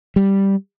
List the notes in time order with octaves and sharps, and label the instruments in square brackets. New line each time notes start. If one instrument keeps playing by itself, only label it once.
[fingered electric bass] G3